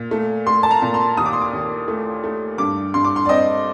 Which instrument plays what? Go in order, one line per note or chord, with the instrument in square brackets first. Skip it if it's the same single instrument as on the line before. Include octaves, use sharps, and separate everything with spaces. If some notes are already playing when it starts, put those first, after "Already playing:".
Already playing: [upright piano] A#2
A3
A3 C6
A5
A#5
A#2
C6
D#2 D#6
D6
C6
D6
D#2
A3
A3
G2 D6
G2 C6
D6
C6
D5
C4 D#5